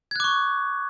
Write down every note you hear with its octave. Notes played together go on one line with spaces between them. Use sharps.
C#6 D6 F#6 G#6